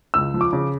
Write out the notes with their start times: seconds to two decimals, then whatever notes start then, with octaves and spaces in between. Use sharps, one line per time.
0.14 C#2 E6
0.34 F3
0.41 D6
0.53 C#3